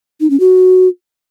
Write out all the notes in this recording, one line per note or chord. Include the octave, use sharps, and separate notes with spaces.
D#4
C#4
F#4